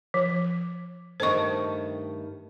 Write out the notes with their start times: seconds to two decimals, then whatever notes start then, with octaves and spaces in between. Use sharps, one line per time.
0.14 F3
1.20 G2 D#3 A3 C5 C#6